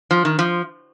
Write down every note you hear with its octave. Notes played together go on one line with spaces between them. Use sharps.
F3
D#3
F3